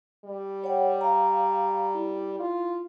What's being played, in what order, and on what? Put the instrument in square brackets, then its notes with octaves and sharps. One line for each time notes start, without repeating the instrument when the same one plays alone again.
[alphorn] G3
[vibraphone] C#5 F#5 G5
F5 A#5
E4
[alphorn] F4